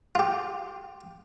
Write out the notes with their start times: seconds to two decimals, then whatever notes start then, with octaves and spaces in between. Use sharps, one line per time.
0.15 F4 G4